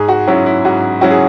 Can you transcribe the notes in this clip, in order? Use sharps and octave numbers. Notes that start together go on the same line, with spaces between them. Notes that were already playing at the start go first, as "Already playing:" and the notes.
Already playing: G#2 G#4
F#4
F#3 C#4 E4 F#4
E4
G#2 F#4
F#3 C#4 E4 F#4
G#4